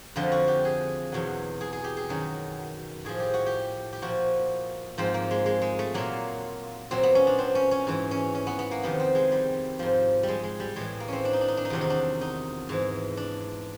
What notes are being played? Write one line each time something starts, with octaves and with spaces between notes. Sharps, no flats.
F2 D3 F3 F4
F#4
G4
G#4
E2 B2 F#3
G#4
G#4
G4
G#4
F#2 D#3 F#3
A2 F3 G#4
G4
F#4
G4
G4
A#2 F3 F#4
G#2 F3 C4
A#3
G#3
G#3
G#3
A3
A#2 F#3 A#3
A#2 F#3 C4
B3
C#4
D4
C4
C#4
C#4
G#2 E3
C#4
C#4
B3
B3
A#3
F2 C3 D#3 B3
C4
G#3
G3
G#2 F3
G3
G#3
G#3
G3
A2 E3 G#3
A#3
C4 C#4
D4
D#4
D4
D#4
D4
D#4
E2 C3 D#3 F#3 D4
D#4
D4
D#4
G#2 E3
D4